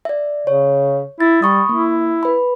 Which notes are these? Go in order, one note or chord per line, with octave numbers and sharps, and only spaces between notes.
D5 E5
C#3 C#5
E4 A6
G3 B5 C#6 D#6
A#3 E4
B4 B5